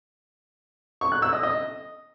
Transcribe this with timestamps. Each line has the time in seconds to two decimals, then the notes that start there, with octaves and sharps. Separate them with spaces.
1.01 C#6
1.12 F#6
1.22 E6
1.33 D#5
1.43 D#5